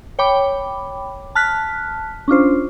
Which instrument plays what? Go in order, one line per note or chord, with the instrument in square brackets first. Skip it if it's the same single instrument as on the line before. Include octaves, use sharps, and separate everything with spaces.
[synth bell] C#5 G5 B5 D6
A5 F6 F#6 B6
C#4 D4 F4 C5